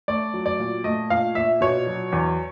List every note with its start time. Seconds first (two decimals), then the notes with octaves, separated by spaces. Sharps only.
0.08 A3 D5
0.34 F#3
0.46 D5
0.59 A#2
0.84 A3 D#5
1.10 A#2 F5
1.35 A#2 E5
1.61 B2 C#5
1.87 F#3
2.12 E2